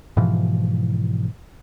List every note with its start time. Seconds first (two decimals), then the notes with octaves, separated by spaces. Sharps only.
0.17 G#2 B2 E3 F3